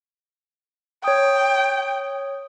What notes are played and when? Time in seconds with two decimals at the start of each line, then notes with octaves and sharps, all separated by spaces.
1.04 C#5 G5 D#6